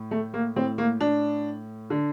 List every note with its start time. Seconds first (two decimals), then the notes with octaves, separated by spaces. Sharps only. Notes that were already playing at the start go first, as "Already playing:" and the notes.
Already playing: A2
0.11 A3
0.34 A#3
0.56 A2 C4
0.78 A#3
1.01 D4
1.90 D3